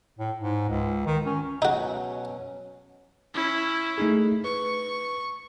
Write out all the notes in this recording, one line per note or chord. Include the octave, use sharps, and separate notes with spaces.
A2
G#2
C#2
D#3
C#4
B2 F#3 C#4 D#4 F#4
C#4 E4
A3 D#4 G#4
B4 C#6